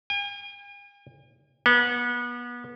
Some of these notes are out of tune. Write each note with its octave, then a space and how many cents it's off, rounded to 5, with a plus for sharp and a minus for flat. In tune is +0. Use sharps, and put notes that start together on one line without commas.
G#5 -45
B3 -30